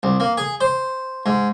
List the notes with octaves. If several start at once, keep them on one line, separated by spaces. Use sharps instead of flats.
C2
A#3
G#4
C5
G#2